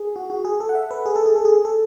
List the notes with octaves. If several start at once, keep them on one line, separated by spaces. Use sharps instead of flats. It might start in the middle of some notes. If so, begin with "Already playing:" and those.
Already playing: G#4
F#4
F#4
G#4
A4
F#5
E5
B4
G#4
A4
G#4
A4
G#4
A4